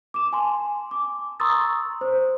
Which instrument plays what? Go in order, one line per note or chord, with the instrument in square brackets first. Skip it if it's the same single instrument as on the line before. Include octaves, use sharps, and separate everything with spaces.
[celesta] D6 E7
G#5 A5 C6
D6
A#5 C6 C#6 D#6 E6 A6
C5